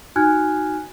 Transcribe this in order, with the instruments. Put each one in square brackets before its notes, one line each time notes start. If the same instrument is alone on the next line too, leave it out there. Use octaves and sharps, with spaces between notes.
[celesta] D#4 F#4 G#5 F6 F#6 G#6